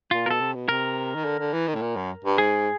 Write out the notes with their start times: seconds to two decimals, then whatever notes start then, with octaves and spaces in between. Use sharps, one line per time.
0.11 A#2 F4
0.26 B2 A#4
0.31 A4
0.40 C3
0.55 B2
0.69 C3 A#4
1.15 D#3
1.25 D3
1.39 D3
1.53 E3
1.68 D#3
1.75 A2
1.81 A#2
1.96 F#2
2.24 G2
2.38 G#2 G#4